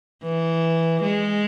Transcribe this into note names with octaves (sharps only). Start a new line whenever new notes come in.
E3
G#3